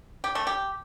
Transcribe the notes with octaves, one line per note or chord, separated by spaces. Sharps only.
G4
A3
G4